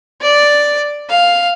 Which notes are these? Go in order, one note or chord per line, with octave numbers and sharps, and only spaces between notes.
D5
F5